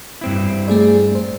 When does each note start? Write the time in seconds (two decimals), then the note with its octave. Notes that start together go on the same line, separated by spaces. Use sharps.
0.21 G2 C4 E4
0.68 A3 G#4 D5
1.15 C5